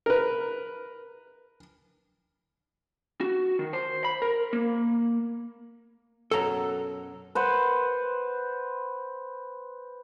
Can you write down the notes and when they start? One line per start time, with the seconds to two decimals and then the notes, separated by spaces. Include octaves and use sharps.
0.06 A#4 B4
3.21 F#4
3.59 D#3
3.73 C5
4.05 B5
4.22 A#4
4.53 A#3
6.31 F#2 B2 F#3 A4 A#5
7.35 B4 C5 F#5